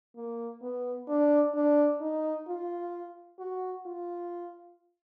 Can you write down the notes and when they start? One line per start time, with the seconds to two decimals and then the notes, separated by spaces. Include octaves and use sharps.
0.17 A#3
0.62 B3
1.08 D4
1.55 D4
2.01 D#4
2.48 F4
3.39 F#4
3.86 F4